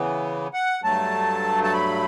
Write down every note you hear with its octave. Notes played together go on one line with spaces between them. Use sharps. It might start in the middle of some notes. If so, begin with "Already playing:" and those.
Already playing: C#3 E3 B3
F#5
G2 F#3 A3 A5
A5
B5